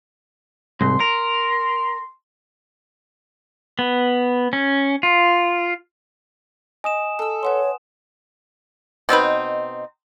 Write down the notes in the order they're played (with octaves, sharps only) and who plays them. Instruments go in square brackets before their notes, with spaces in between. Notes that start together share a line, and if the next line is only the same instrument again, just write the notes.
[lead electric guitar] C2 G#2 [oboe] C6
[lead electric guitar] A#4
[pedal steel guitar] B3
C#4
F4
[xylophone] D#5 [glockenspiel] G#5 D#6 E7
[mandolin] A4 E6 [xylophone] A5
[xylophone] B4 F#5 C6 [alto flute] C#5
[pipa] B2 C4 D#4 B4